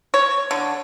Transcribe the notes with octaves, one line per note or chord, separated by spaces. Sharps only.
C#5
D3